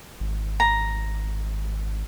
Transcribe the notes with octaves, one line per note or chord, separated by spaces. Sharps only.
G#1
A#5